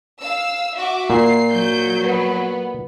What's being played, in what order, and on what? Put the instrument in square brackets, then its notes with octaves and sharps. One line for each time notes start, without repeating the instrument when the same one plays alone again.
[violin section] F5 E6
F#4 E5 D6
[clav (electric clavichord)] A#2 [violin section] C7
[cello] F#3 [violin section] G6
[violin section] B3